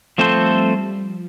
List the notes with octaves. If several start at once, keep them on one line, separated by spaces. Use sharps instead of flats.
F3 G3 A3 C4 A4 C5
F3